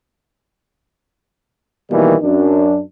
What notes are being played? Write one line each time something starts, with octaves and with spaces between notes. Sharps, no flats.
B2 D#3 E3 G3 A#3
F#2 D4